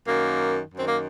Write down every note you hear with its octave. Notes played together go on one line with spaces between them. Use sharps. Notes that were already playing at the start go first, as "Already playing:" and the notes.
F#2 D#3 A#3
F#2 D#3 C4
A#3